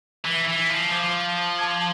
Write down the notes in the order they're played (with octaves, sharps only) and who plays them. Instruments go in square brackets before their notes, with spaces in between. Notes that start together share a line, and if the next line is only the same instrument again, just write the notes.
[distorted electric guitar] E3 [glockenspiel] B5 D6 A6 D7
[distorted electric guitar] E3
F3
[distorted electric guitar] F3 [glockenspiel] D6 G#6 D7
[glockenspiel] A5 D6 G#6